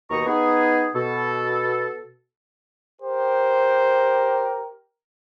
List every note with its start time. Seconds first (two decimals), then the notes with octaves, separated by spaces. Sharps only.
0.10 D#2 B2 D#3 D#5 A#5 C#6
0.27 B3 D#4 G#4
0.94 B2 A4
3.02 G4 A#4 C5